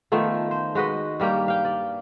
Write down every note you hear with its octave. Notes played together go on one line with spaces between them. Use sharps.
D#3 F3 A3 B3
C5
G#3 F#4 B4 D#5
G2 G3 A#3 G5
F5 G5
D5